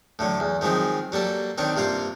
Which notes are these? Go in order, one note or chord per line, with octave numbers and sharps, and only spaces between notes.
A2 D3 F#3
E2
D#3 F3 F#3 G#3 C4
F#3 G3 A#3 A4
D#3 C4 D4 C#5
G2 C3 A#3 F4 F5